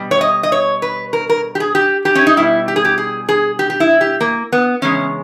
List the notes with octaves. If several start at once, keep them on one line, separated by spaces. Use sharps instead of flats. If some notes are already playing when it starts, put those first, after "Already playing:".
Already playing: B2 G3
C#5
D#5
D#5
C#5
B4
A#4
A#4
G4
G#4
G4
G4
C#4
D#4
B2 G3 E4
G4
G#4
G4
G#4
G#4
G4
G4
E4
G4
A#3
B3
E2 C#3 G#3 C#4